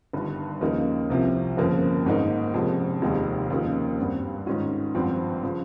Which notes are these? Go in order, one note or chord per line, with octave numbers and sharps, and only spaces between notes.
G1 G2 D#3
D#2 C#3 F3 A#3 D#4
C2 C3 F3
G1 F2 C#3 F3 A#3
G#1 G#2 D#3 A#3 D#4
F1 F2 C#3 G#3
F1 D#2 D#3 G#3
D#2 C#3 F3 A#3 D#4
G#1 G2 G3 C4
G#2 D#3 G#3 C#4 F4
G#1 G2 F3 C4 F4
C#3 F3